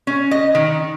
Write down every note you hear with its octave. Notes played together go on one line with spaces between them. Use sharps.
C#4
D#5
D#3